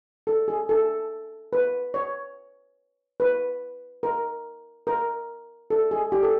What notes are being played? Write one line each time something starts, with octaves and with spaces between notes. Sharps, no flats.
A4
G#4
A4
B4
C#5
B4
A#4
A#4
A4
G#4
G4
A4